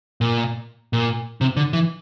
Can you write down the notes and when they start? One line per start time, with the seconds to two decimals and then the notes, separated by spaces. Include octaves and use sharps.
0.21 A#2
0.93 A#2
1.41 C3
1.57 D3
1.73 E3